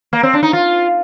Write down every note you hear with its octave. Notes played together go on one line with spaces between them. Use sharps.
A#3
C4
D4
D#4
F4